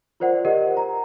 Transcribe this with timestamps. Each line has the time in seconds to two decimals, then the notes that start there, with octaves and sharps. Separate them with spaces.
0.20 F4 A#4 C5 D5 F#5
0.45 G4 A#4 D#5 F#5
0.77 A#5